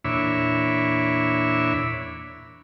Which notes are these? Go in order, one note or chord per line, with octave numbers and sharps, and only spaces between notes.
E2 A#2 D4 C#5 E5 B5